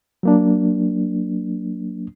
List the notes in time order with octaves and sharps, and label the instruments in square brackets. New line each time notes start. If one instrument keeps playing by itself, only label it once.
[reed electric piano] F#3 A#3 D4